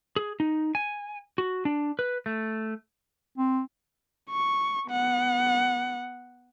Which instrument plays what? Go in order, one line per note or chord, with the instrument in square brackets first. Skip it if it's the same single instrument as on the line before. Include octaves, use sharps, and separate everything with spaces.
[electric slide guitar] G#4
D#4
G#5
F#4
D4
B4
A3
[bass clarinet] C4
[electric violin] C#6
B3 F#5